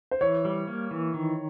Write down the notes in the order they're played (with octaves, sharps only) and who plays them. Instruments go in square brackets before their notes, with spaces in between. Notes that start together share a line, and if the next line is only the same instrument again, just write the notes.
[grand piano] C5
[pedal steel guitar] E3 [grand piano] C#5
[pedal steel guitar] G3
A#3
E3
D#3